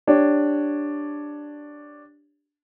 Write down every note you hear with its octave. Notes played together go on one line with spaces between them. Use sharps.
D4 G4 C#5